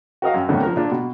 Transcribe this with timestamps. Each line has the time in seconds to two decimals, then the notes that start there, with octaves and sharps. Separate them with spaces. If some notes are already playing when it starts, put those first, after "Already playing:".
0.22 F#4 A#4 D#5 F5
0.34 F#2
0.49 F2 A2 D#3 A3 B3 D4
0.62 F3 A#4
0.76 A#2 D4 F4
0.91 B2